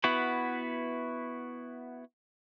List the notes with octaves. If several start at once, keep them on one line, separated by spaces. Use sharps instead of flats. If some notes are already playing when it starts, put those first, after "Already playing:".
B3 E4 F#4 B4